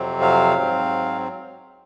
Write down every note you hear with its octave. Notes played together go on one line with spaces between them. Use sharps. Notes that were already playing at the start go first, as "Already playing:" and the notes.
Already playing: F2 C3 F#3 C4
F5
G#2 F#3 C4